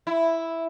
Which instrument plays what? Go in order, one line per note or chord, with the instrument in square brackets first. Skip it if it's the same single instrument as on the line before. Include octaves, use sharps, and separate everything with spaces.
[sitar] E4